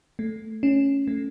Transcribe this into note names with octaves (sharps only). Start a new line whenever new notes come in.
A3
C#4
A3